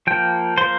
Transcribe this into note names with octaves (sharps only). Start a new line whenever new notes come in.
F3 A#3 G5
F3 A#3 C5